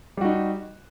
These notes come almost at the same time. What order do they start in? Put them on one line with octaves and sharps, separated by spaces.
G3 F#4 D#4